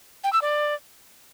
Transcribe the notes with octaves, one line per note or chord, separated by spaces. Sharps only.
G5
E6
D5